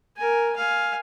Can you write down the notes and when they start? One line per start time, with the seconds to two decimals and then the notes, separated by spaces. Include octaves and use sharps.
0.17 A#4 G#5
0.56 F5 G#5